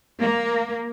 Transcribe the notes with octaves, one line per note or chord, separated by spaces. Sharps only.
A#3